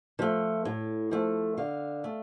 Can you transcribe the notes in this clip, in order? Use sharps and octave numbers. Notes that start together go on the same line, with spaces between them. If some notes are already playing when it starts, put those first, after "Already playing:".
F3 A3
A2
F3 A3
D3 F5
A3